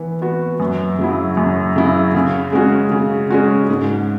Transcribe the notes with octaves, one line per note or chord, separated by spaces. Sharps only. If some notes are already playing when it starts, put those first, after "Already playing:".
Already playing: E3 B3
B3 F#4
F#2
C#3 F#3 E4
F#2
C#3 F#3 E4
C#3
G#3 C#4 F#4
C#3
G#3 C#4 F#4
G#2